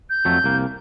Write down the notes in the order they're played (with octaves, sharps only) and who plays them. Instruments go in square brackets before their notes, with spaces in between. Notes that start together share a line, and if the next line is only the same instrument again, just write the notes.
[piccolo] G6
[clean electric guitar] F2 F#3 A3
C2 A#3